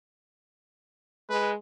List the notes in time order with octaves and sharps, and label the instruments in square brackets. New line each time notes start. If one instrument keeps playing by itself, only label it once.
[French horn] G#3 [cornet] B4